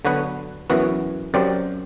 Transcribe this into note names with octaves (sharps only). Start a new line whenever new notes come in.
D3 F#3 B3 F#4 B4
F#2 E3 B3 F#4
F#2 F#3 C4 G4 D5